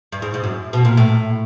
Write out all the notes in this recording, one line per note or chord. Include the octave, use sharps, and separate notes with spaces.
G2
G#2
G#2
F#2
B2
A#2
A2